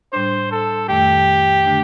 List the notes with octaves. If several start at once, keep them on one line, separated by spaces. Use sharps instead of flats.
A2 G3 D4 C5
A4
F2 D#3 A3 G4
D3 A3 D4